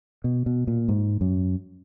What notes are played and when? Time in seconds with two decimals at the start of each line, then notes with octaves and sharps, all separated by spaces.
0.24 B2
0.46 B2
0.67 A#2
0.88 G#2
1.21 F#2